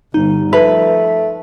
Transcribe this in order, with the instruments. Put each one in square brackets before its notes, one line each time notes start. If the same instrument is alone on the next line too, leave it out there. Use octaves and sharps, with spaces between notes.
[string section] G1 [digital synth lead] D#4
[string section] F3 [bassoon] A3 [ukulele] B4